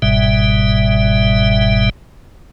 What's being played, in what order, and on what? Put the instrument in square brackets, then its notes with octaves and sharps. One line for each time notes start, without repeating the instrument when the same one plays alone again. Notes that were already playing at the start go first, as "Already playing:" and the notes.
[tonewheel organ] G1 G#2 B2 G3 E5